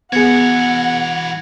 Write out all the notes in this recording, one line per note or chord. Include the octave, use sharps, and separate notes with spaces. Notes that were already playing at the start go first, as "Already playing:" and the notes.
E3 B3 F#4 G#4 F#5 G#6 C#7